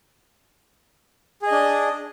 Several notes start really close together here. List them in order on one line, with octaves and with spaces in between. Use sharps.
G#4 D#5 D4